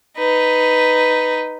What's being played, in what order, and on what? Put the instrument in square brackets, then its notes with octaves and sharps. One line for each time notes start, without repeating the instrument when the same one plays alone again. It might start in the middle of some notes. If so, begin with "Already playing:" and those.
[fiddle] D#4 B4